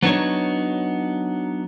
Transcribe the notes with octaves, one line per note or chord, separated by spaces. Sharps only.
F#3 B3 D4 D#4 C#5